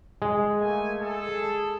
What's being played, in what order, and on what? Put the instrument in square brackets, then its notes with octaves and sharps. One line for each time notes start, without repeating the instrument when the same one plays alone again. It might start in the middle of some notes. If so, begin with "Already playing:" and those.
[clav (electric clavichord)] G#3
[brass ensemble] A3 A#3 G#5
G#4 A4